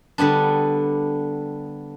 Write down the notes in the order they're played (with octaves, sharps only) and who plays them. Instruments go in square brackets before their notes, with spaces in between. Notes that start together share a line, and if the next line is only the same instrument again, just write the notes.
[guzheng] D3 G3 B3 D4